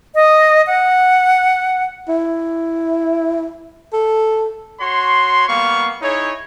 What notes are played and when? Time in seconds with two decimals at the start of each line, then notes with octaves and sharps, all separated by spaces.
0.15 D#5
0.67 F#5
2.09 E4
3.93 A4
4.80 F#4 C#5 C6
5.48 G3 A#3 B3 F5 C#6
6.02 D#4 E4 G#4 C#5